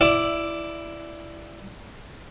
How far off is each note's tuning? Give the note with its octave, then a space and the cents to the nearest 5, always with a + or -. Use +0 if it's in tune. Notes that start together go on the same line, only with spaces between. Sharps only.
E4 +10 D5 +0